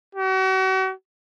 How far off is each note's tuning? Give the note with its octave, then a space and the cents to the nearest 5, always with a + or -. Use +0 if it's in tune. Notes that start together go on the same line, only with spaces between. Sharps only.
F#4 +40